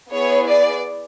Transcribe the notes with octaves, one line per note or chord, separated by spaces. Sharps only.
B3 E4 G#4 C#5
D5